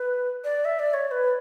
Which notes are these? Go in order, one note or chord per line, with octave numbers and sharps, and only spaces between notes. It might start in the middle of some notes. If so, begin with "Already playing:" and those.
Already playing: B4
D5
E5
D5
C#5
C#5
B4